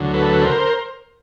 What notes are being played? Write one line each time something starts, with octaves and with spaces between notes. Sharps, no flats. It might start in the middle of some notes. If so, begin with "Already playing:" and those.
Already playing: D2 D3 F#3
A4 B4
A#4 C5